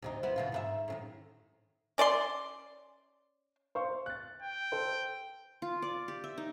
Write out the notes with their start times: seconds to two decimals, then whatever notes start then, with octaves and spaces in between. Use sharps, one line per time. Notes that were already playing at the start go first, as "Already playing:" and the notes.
0.02 D2 C3 D#4
0.23 B3 C4 E4
0.36 B2 D3 F4
0.52 G#2 B4 E5
0.88 A2 C3 D#3
1.98 C#4 D5 E5 C6
3.75 C5 F5 C#6
4.06 F#6 A6
4.42 G5
4.72 A4 C5
5.62 F4
5.82 D5
6.08 G4
6.24 E5
6.38 D#4